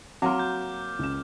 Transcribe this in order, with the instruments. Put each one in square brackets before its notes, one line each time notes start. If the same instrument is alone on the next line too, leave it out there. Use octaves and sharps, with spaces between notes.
[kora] F#3 A#3 [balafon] C4 [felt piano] F#5 A#5 C6 [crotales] D6 F6
[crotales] G6
[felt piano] C#2 E7